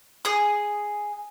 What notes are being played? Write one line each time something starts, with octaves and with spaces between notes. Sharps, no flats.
G#4 D#6